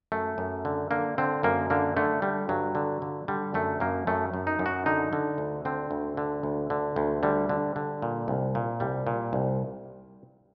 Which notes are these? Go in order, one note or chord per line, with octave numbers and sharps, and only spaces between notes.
F#2 A3
F#2
D3
D3 A#3
D3 C4
F#2 A#3
D3 A#3
D3 A3
D3 G3
G2 F#3
D3
D3
D3 G3
F#2 A3
F#2 A#3
F#2 A3
F#2
D#4
F#2
F#4
D3 D#4
D3
D2
D3 C4
D2
D3
D2
D3
D2
D3 G3
D3
D3
A#2
C2
A#2
C2 G3
A#2
C2